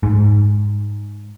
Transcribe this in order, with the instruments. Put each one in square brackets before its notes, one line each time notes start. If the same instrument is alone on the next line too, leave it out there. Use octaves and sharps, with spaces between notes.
[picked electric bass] G#2